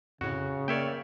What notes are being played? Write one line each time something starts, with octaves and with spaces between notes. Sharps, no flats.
F2 A2 C#3 F#4
A#3 A#4 C#5 D5 E5 G5